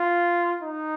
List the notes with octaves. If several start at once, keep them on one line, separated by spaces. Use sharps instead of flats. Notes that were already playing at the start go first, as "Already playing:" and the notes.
Already playing: F4
D#4